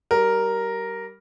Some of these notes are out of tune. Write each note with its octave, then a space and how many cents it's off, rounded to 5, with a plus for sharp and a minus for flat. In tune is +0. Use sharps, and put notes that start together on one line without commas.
G3 -20 A#4 +0